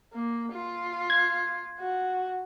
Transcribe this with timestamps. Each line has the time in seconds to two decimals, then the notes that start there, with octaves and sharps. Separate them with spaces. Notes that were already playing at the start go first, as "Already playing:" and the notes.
0.13 A#3
0.52 F4
1.10 G#6
1.80 F#4